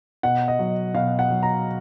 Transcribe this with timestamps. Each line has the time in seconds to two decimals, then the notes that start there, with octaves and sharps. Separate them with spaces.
0.23 B2 F#5
0.48 D#5
0.59 F#3
0.94 B2 F5
1.19 F#5
1.30 F#3
1.43 A#5